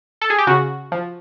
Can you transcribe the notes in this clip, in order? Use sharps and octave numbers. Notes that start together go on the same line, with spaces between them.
A4
G#4
G4
C#3 F#4
F3